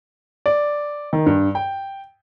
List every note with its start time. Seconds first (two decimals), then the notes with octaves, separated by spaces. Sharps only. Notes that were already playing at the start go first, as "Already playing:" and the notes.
0.46 D5
1.13 D#3
1.26 G2
1.55 G5